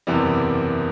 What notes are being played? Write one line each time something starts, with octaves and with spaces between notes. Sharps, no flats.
F#1 E2 C3 E3 G3